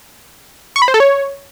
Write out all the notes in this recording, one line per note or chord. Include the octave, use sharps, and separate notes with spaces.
C#6
B5
C5
A4
C#5